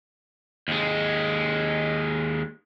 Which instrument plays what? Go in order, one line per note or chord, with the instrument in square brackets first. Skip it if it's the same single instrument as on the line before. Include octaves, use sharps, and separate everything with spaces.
[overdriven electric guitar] D#2 G#3